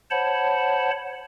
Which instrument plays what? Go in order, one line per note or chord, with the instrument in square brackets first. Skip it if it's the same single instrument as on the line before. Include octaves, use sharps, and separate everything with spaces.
[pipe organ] C5 C#5 F#5 A5 B5